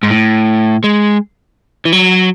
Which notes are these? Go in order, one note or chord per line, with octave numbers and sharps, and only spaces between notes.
G#2
A2
G#3
E3
F#3